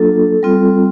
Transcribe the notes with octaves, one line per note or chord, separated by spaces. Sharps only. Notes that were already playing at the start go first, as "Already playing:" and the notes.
Already playing: F#3 A#3 D4 F4 A4
G3 C4 F4